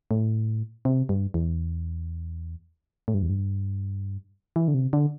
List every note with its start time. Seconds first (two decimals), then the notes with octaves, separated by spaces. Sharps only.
0.11 A2
0.85 C3
1.09 G2
1.34 E2
3.08 A2
3.14 G2
3.22 E2
3.29 G2
4.56 E3
4.68 D3
4.74 C3
4.93 D3